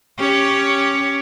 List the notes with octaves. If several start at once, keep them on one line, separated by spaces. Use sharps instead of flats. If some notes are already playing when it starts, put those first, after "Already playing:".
C#4 G4 C#5